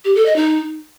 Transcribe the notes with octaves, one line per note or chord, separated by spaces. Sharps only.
G4
A4
D#5
D#4